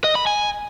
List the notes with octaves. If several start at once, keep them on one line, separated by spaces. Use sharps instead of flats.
D#5
B5
G#5